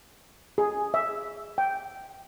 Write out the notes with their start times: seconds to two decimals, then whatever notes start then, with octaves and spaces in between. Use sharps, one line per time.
0.58 G#4
0.94 E5
1.58 G5